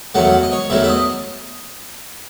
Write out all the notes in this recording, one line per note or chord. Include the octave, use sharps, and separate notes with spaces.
E2 D#3 F#3 A3 F#5
D#5
C#5
E2 D#3 F#3 A3 E5
E5
D#5